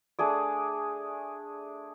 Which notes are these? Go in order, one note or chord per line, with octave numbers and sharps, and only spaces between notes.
A3 D4 G#4 D5